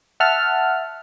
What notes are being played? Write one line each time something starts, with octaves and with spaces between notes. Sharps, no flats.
E5 F#5 A5 F6